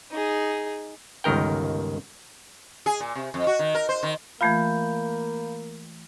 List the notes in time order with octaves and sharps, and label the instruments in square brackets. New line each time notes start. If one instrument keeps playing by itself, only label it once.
[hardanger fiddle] D#4 G#4
[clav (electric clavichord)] G1 C#2 D#3 A#4 G5
[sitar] G#4
A#2
C3
F2
F#4
D#3
A#4
C5
D#3
[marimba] E3 A3 F4 [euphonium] A#3 [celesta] F5 B5 G6